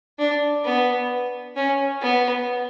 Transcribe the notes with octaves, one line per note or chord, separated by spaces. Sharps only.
D4
B3
C#4
B3